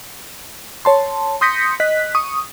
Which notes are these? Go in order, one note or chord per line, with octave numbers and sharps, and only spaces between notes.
C#5 A5 C6
C6 D#6 G6 A#6 B6 C#7
D#5 F#6 B6
C#6 D#6